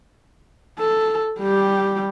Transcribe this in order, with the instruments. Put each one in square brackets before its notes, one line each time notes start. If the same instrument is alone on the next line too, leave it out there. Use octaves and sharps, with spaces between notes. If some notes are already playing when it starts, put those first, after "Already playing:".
[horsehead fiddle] A4
G3 G4